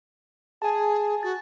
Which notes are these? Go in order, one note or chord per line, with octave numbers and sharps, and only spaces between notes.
G#4 G#5 A5
F#4 A6